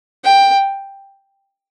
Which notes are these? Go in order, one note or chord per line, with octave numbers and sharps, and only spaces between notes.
G5